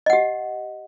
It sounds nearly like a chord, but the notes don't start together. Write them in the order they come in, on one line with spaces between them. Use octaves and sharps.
D#5 F#5 G4